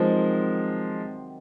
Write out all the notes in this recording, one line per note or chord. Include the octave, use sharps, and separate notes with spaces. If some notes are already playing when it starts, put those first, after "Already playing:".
Already playing: C3 D#3 F3 F#3 G#3 C4